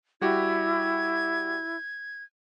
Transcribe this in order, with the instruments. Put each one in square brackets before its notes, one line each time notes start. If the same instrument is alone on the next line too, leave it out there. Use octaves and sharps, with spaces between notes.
[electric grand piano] G3 F#4 G4 [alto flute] E4 [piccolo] G#6